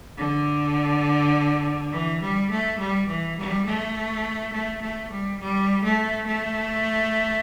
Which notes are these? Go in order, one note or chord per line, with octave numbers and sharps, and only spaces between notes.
D3
E3
G3
A3
G3
E3
G3
A3
A3
A3
G3
G3
A3
A3